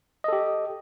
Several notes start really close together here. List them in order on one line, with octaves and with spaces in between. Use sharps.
D#5 A4 G4